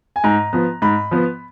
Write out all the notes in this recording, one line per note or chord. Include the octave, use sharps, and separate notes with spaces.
G#5
G#2 A#5
F3 B3
G#2 B5
F3 B3